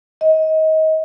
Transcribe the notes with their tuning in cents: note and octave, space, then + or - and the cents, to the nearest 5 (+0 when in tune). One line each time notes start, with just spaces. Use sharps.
D#5 +25